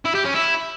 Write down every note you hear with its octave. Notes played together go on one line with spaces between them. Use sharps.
E4
G4
C#4
E4